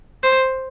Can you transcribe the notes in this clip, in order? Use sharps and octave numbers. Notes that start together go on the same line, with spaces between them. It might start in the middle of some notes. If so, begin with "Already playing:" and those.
C5